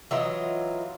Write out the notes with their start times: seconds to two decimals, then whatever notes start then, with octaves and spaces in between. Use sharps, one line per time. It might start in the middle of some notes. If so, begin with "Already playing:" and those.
0.11 E3 F#3 F4 D#5